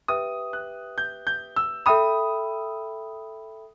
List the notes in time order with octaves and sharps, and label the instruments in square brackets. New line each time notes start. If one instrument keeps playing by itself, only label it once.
[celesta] G4 B4 E5 G5 [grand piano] D#6
[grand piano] F#6
G6
G6
E6
[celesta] A4 E5 G5 B5 [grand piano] D#6